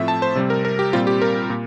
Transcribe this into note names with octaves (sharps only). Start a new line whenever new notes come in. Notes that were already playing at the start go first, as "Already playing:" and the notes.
Already playing: A2 F3 A3 C4 E5
A5
C5
C3 G3 C4
A#4
A#4
G4
A#2 G3 C4 F4
G4
A#4
A#2